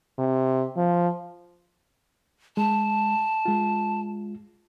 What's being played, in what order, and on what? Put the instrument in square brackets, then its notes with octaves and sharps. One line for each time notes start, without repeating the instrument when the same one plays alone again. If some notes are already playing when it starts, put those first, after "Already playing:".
[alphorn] C3
F3
[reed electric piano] G#3 [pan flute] A5
[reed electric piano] G#3 F4